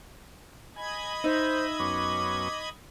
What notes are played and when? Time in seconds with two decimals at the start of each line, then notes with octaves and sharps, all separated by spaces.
0.76 D#5 G#5 B5 G#6
1.24 D#4 C5 E5
1.79 F#2 B3 C#4 D6